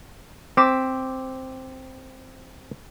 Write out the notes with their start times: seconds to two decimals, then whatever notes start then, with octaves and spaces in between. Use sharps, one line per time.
0.57 C4 D6 B6 E7